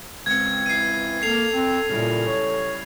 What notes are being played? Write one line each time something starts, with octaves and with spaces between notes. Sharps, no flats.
C#2 C4 G#6 C#7
E3 C7 D#7
A#3 A4 C7 F7
C4
A#2 C#3 G3 E4
C#5